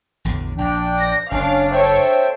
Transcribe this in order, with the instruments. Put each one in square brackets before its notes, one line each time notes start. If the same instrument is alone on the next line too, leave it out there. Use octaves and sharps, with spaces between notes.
[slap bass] A1 E2 D3
[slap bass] A#1 [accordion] D4 G5
[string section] A#6
[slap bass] F#1 [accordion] C#4 [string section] D4 F5
[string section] A4 C#5 [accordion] C5 E5 G5